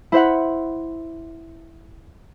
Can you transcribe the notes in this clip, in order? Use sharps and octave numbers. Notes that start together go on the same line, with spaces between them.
E4 C5 E5 F#5